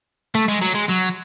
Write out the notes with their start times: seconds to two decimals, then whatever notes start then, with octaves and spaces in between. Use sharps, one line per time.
0.35 A3
0.48 G#3
0.62 F#3
0.75 G#3
0.89 F#3